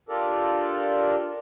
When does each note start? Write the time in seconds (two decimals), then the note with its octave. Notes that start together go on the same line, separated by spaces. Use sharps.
0.09 D4 F4 G4 A4 A#4 D5